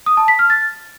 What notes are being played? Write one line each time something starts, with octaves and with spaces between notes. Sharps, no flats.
D#6
A5
B6
F6
A6